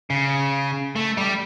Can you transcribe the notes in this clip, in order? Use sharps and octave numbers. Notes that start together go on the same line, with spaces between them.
C#3
A3
G3